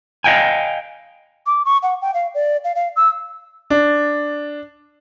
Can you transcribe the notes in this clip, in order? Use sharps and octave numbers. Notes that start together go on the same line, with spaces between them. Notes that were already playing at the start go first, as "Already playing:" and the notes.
D#5 F5 G5 G#5
D6
C#6
F#5
G5
F5
D5
F5
F5
E6
D4